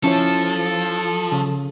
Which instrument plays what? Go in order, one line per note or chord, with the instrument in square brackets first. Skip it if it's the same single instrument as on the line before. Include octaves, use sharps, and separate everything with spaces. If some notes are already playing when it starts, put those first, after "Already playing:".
[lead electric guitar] F3 [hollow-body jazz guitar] C#4 E4 C#5 [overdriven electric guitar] A4
[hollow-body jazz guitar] C#3